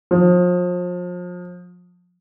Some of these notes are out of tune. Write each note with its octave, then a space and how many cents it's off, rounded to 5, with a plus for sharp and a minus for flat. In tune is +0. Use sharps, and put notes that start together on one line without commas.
F3 +35